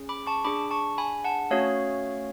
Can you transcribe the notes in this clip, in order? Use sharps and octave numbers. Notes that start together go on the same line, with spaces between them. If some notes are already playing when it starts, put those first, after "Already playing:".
Already playing: C#4 G#4
B5 D6
A5 C#6
D4 G#4 B5 D6
A5 C#6
G#5 B5
F#5 A5
A3 C#4 F#4 C#5 F5